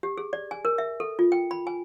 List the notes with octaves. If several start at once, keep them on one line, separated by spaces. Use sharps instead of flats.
G4
G#4
D5
G#5
A#4
E5
A4
F4
G5
B5
G#5